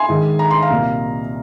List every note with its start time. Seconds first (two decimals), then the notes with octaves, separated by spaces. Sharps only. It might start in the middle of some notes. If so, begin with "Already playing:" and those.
Already playing: G#5 C6
0.09 G#2 D#3 G#3
0.39 A#5
0.50 C6
0.62 F5 A#5
0.70 C2 A#2 A#3